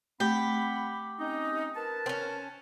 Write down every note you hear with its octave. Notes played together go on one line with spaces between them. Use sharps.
A3 C4 G4 F#5 B5
C4 C#4 D#4
A#4 B4 A5
C4 C#4